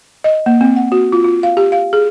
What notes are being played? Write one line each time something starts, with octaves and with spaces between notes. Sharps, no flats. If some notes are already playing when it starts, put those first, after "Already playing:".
D#5
A#3
C4
F#5
F#4
F4
F4
F5
G4
F5
G#4